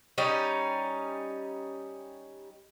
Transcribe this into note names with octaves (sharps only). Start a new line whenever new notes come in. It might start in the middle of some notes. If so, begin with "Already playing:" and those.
G3 C#4 D#4